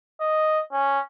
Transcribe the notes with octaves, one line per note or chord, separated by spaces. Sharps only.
D#5
C#4